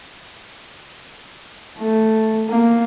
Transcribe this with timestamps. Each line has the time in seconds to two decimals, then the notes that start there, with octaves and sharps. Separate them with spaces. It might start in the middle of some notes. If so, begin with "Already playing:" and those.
1.79 A3
2.48 A#3